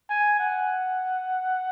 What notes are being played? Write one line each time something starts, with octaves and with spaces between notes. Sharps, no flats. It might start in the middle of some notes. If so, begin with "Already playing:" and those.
G#5
F#5